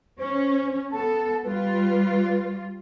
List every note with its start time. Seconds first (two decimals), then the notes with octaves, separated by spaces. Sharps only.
0.19 C#4 C5
0.91 B3 A4 A5
1.44 G3 F4 B4